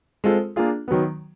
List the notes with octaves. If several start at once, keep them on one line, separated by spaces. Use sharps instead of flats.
G#3 C4 F4 A4
A#3 D4 F4 G#4
D#3 F#3 B3